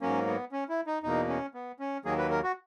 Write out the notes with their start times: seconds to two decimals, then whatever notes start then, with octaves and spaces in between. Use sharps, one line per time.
0.01 G#2 F#3 A#3 C#4
0.27 B3
0.52 C#4
0.69 E4
0.87 D#4
1.03 E2 B2 A#3 D#4
1.29 C#4
1.54 B3
1.80 C#4
2.05 D#2 D#3 F#3 A#3 G#4
2.18 B4
2.30 A#4
2.43 F#4